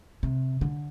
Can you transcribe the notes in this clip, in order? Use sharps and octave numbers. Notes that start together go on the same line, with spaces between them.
C3
D3